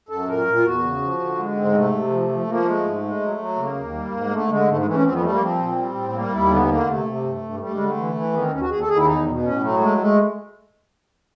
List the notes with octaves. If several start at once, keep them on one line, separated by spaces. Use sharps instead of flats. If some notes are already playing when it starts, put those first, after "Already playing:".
F#2 A4
A#2 A#4
A#2
F4
E2 F#4
C#3
F3
D3
G#3
G#2 C4
C3 A3
C3
F3
F3
F3 A#3
G#3 A3
G#2
G#3
F#3
F#3
C#3 A#3
D#2
G3
G#2
D3 A3
D3 G#3
G#2 A3
G#3
E3 A3
C#4
F2 C4
B3
G3 A3
A#3
F3 C4
A#2
G3
A2
G3 A#3
D#2 E4
D3 B3
D3 A#3
C3 A3
C3
G2
G2
G3 A3
G#3
D3
A3
E3
E3
D#3 B3
C4
D#2 C#4
F#4
D#2 G#4
A4
D#2 G#4
E4
E2 D#4
B2
A2 C#4
F#3 A3
G#3 A3
G#3 A3